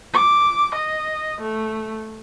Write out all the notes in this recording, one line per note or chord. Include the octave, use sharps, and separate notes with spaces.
D6
D#5
A3